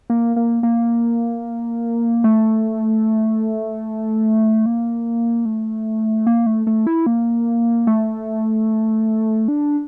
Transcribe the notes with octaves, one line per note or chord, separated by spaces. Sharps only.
A#3
A#3
A#3
A3
A#3
A3
A#3
A3
A3
E4
A#3
A3
D4